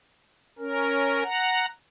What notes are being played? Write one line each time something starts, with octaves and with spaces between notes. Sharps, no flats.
C#4 A#4
F#5 A#5